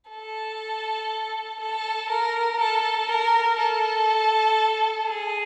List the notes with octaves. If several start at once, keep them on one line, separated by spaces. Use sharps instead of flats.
A4
A4
A#4
A4
A#4
A4
G#4